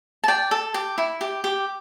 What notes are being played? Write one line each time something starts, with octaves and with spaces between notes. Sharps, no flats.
A5
D5 G5
A4
G4
E4
G4
G4